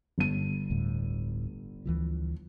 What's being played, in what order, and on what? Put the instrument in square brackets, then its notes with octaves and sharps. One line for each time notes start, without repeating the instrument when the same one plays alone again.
[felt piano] G1 D#7
[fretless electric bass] D1 D2 A2
D2 E3 F3